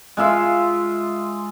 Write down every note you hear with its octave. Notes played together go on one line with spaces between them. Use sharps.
G#3 F4 E5 F5